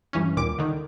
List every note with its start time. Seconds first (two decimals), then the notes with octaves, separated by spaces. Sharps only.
0.13 G2 E3 C#4
0.37 D#2 A#2 D6
0.58 D3 D#3